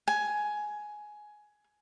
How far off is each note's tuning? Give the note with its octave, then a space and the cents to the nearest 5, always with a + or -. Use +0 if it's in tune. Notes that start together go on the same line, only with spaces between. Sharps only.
G#5 +15